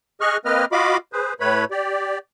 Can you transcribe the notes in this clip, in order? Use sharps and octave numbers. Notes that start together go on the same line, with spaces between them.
G#4 D#5 C#6 F6 F#6
A#3 C4 B4 D#5 F6
F4 F#4 D#5 F5 B5 D6
G#4 B4 C5
A2 A3 B4 C#5 B5
G4 D5